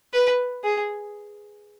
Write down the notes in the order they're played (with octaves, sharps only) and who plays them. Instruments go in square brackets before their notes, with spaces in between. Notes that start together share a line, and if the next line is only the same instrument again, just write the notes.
[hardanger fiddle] B4
G#4